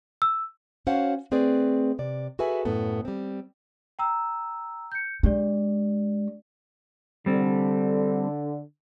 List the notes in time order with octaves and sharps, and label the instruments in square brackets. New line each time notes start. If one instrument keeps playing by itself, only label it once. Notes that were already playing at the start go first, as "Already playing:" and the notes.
[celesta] E6
[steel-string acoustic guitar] C#4 F#4 C5 C#5 F5 F#5
A3 C4 G#4 B4 D5
C3 D5
F#4 G#4 A4 B4 E5 G#5
F#2 A2 B3 A4
G3 C4
[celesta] G5 A#5 E6
G6 C#7
[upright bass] G#3 [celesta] D4 G4 D5
[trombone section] D3 [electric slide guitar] G3 C4